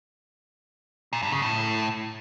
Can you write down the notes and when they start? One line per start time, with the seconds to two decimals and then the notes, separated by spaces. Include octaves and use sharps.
1.13 A#2
1.22 G2
1.32 C#3
1.42 A2